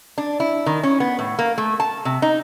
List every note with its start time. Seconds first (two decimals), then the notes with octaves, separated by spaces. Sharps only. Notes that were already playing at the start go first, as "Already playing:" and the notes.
0.18 D4
0.40 E4
0.66 D#3
0.83 C#4
1.00 B3
1.19 A2
1.39 A#3
1.58 A3
1.80 A5
2.05 C3
2.22 D#4